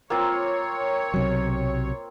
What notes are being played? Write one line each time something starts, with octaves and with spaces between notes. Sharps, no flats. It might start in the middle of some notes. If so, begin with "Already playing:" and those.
A#3 C4 F4 C#5
B1 C3 F#3